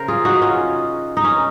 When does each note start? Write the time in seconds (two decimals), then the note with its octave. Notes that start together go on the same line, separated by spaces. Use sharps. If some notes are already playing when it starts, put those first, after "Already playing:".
Already playing: C#3 A#4 C5
0.08 F4 G#4
0.25 D#4 F#4
0.42 C#4 F4
1.17 D#4
1.24 C#4